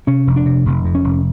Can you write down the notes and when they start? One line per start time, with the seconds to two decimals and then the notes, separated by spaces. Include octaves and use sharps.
0.07 C3 C#4
0.27 F1
0.36 D4
0.46 C3
0.65 F1
0.85 F2
0.95 C#4
1.04 F1